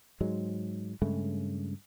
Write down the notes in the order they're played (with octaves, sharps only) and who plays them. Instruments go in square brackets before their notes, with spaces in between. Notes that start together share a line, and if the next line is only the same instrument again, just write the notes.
[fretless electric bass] G#2 F#3 G#3
G2 C#3 G#3 A3